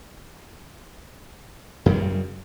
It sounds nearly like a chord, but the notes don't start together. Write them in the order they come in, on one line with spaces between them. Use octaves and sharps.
F#2 G3 C#3